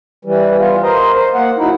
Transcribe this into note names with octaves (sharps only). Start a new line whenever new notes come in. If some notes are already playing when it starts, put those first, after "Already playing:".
E3 G3
B3 F4
A#4 C5 D#5
C5
A#3 F#5
F#3 D#4 E4